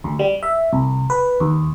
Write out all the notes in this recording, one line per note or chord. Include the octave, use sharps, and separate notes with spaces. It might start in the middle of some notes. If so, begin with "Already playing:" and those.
D2
G3
E5
C2
B4
D#2